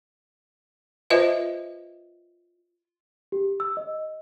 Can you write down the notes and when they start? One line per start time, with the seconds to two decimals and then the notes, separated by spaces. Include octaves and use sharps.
1.10 F4 B4 C5 D#5 E5
3.32 G4
3.60 E6
3.77 D#5